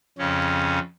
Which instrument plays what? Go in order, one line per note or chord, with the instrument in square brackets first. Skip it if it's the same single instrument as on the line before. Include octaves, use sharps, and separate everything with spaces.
[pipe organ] F2 C#3 C#4